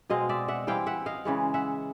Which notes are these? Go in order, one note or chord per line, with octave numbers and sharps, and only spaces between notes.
B2 G#3 C4 D#5 F5
D5 E5
E5 F#5
E3 G3 C4 E4 F5 G5
E5 F#5
D#5 F5
C#3 E3 G#3
E5 F#5